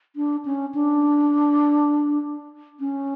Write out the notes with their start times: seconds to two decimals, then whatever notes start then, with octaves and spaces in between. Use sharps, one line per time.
0.16 D4
0.45 C#4
0.75 D4
2.80 C#4